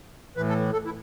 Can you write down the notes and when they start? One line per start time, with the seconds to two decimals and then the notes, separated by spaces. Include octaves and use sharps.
0.37 A2 E3 B4
0.49 A4
0.73 A4
0.85 E4